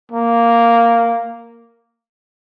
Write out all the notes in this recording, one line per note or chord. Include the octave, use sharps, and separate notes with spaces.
A#3